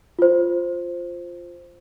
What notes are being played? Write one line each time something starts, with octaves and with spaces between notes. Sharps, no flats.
F4 C5